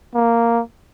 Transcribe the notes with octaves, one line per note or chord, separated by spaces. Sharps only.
A#3